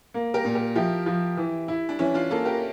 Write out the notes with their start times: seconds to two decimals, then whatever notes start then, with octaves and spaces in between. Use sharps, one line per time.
0.14 A#3
0.34 G4 A#4
0.45 A#2
0.55 G4 A#4
0.75 F3 E4 G4
1.06 F3
1.37 E3
1.68 E4
1.89 D4
1.99 E3 C#4 E4
2.14 D4 F4
2.30 A#3 F4 A4
2.45 G4 A#4